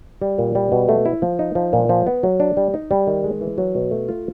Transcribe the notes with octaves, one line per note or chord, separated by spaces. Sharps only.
G3
A#2
G3
B2
A3
E4
F3
D#4
F3
A#2
F3
B3
F#3
D4
G3
D#4
G3
D#3
G#3
E3
F#3
B2
A3
F4